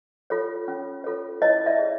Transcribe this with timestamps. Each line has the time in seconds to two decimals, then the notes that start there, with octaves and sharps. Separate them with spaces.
0.30 F4 A4 C#5
0.68 C#4
1.04 F4 A4 C#5
1.42 E4 C#5 D#5
1.66 D5 E5
1.78 G#4 C#5